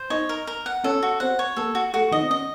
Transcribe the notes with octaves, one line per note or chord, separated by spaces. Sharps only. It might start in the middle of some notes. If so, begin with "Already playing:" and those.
Already playing: C5
D#4 C#5 D#5
A#4
A#4
F#5
C#4 A4 C#5
F#4
C4 C5 F#5
C#5
A#3 A4 A#4
F#4
A3 F#4 A4
D#3 D#4 D#5
C4
C#4 D#5